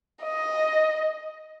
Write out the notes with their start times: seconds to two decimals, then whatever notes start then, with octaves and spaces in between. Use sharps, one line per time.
0.22 D#5